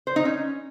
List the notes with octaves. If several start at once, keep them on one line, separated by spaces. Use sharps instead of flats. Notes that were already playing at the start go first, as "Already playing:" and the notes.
C5
D#4
C#4